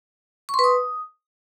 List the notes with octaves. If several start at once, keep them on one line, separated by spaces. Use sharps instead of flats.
C#6
C6
B4
D#6